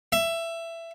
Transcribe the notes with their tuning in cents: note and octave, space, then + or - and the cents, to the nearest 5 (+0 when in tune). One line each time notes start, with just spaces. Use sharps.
E5 +15